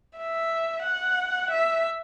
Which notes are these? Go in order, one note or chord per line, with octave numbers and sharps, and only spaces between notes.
E5
F#5
E5